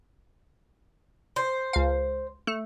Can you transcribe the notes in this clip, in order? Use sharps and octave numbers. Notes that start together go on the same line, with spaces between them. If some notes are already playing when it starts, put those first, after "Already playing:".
C5
C#2 F5
A3